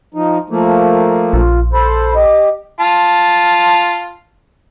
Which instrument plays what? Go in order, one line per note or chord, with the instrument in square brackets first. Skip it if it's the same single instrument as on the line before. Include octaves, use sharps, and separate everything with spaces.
[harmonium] F3 D#4
F3 A3 A#3
[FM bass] A#1 [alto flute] F4
[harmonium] A4 C5 [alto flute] B5
[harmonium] G4 [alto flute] D#5
[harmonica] F4 A5